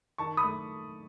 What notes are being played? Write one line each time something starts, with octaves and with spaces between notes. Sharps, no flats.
D#3 A5 C#6
B5 D#6
A3